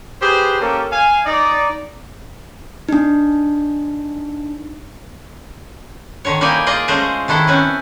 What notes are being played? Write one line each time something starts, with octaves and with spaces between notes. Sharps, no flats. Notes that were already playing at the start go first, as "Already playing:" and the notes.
G4 G#4 B4 C5
A#3 C#4 G4 A4 A#4
F5 G#5
D#4 D5
D4 D#4
D3 D#3 C#5
A#3 D#4 E4 D5 G5 G#5
F4 G#4 D5 D#5
G#3 A3 C#4 G#4 C5 D#5
D#3 D4 E4 A4
C4 C#4 B4